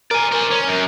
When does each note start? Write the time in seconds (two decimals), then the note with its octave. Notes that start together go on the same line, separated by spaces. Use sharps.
0.11 A#4 D5 G#5
0.32 C5 D5
0.51 C#4
0.67 F#2